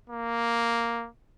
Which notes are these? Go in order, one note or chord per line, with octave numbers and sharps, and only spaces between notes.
A#3